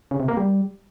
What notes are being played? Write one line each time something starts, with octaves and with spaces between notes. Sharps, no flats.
C#3
C3
A#3
G3